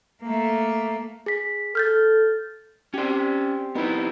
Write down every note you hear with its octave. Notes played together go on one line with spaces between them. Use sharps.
A3 A#3
G#4 B6
A4 F6 G6 A6
C4 C#4 G4 D5
G4
B3 C4 D#4 E4 B4